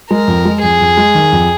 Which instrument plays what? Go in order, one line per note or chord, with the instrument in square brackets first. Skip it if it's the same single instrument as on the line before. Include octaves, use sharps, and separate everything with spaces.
[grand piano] G#3 [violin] A#4
[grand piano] F2
G#3
[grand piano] F2 [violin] G#4
[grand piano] F2
G#3
D#3
F2